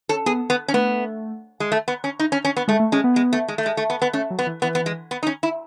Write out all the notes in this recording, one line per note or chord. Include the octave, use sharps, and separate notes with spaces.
C#4 A4
B3 G#4
B3
C#4
A3 B3
G#3
A3
B3
C#4
D#4
C#4
C#4
B3
G#3 A3
A3
G#3 C#4
B3
G#3
A3
G#3
A3
G#3
A3
B3
B3
A3 C#4
F#3
B3
E3
E3 B3
B3
G#3
B3
D#4
C#4
E4